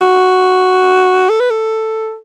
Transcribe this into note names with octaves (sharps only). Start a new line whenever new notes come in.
F#4
A4
B4
A4